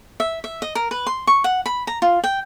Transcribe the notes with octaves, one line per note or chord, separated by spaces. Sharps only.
E5
E5
D#5
A#4
B4
C6
C#6
F#5
B5
A#5
F4
G5